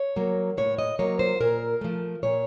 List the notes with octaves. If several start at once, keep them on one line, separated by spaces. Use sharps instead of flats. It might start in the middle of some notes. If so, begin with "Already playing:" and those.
Already playing: C#5
F#3 A#3
A2 C#5
D#5
F#3 A#3 C#5
C5
A#2 A#4
F3 A3
A#2 C#5